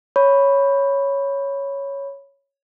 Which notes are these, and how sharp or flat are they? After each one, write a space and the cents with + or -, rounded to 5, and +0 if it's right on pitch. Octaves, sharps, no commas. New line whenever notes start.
C#5 +0 B5 +0